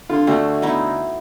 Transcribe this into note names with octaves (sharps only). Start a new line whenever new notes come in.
D3 F4
D2 A3 F#4
B3 D#4 E4